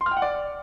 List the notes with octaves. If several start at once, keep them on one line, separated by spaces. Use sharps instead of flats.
C6
F6
G5
F#5
D5